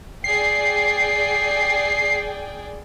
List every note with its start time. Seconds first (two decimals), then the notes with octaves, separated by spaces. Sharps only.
0.24 G#4 D5 G5 C7